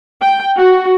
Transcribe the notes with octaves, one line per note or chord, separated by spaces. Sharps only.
G5
F#4